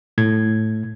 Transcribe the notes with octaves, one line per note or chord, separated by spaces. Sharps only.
A2 G#6